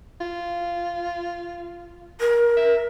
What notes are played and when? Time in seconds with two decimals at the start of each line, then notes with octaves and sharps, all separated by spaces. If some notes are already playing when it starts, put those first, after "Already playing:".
0.21 F4
2.19 A#4
2.57 E5